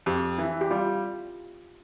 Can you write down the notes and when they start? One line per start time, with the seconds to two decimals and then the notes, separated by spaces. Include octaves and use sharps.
0.06 F2 G4
0.38 E3 E4
0.61 G4
0.71 G3 F4